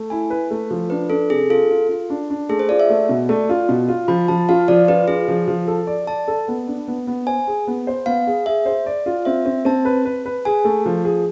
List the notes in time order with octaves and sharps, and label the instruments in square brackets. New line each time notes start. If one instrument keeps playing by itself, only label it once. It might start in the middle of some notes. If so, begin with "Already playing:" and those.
Already playing: [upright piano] A3
[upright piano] E4 [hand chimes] G#5
[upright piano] B4
A3
F3
[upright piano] D4 [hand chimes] B4
[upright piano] D4 [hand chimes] A4
[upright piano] C3 [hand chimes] G#4
[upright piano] F4 [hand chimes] A4
[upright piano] F4
F4
D4
D4
[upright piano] A3 [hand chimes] G#4
[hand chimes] C5
[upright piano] F4 [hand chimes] D5
[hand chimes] E5
[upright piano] A3
B2
[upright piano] A3 [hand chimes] D5
[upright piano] F4
B2
F4
[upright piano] F3 [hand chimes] B5
[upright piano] F3 [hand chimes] A5
[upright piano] F4 [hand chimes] F5
[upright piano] F3 [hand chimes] D5
[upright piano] F4 [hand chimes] B4
[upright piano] F4 [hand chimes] G#4
[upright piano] F3
F3
A4
D5
[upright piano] D5 [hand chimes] A5
[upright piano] A4
B3
D4
B3
B3
[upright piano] C5 [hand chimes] G#5
[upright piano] G#4
B3
C5
[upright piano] B3 [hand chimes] F5
[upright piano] G#4
[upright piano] G#4 [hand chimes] E5
[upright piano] C5
D5
F4
[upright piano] C4 [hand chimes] E5
[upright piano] C4
[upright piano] C4 [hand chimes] A5
[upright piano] B4
B4
B4
[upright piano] G#4 [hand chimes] G#5
[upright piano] A3
F3
G#4